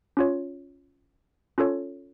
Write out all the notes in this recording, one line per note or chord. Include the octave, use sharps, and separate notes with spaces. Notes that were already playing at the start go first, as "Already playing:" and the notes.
C#4 F4 C#5
C#4 F4 A4 C#5